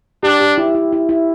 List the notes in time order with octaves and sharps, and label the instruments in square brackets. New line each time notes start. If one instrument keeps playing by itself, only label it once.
[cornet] D4 [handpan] G4
[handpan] G4
E4
E4
E4
E4